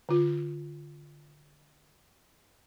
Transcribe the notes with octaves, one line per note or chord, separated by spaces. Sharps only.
D3 F4